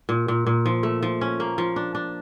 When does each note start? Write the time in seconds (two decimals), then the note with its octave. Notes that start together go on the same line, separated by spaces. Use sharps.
0.09 A#2
0.28 A#2
0.47 A#2
0.66 F3
0.83 A3
1.03 F3
1.21 C#4
1.40 A#3
1.58 F3
1.76 D4
1.95 D4